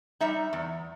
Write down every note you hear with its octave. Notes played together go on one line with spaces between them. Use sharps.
G3 D#4 E5
E2